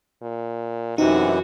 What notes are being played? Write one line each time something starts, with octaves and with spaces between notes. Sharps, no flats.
A#2
F#2 C3 E3 D#4 F#4